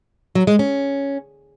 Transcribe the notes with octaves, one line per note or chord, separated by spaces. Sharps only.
F#3
G#3
C#4